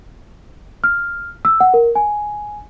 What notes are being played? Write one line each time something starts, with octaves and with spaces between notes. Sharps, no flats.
F6
E6
F#5
A#4
G#5